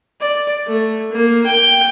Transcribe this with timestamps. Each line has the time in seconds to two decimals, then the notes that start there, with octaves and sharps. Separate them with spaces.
0.21 D5
0.67 A3
1.12 A#3
1.46 G5